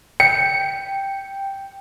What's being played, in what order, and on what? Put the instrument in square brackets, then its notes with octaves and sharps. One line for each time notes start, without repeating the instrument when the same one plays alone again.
[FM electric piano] G5 [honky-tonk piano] C#7